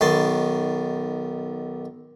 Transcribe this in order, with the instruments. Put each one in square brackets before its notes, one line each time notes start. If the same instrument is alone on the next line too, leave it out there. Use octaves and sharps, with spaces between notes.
[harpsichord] B1 D#3 B3 A5 C6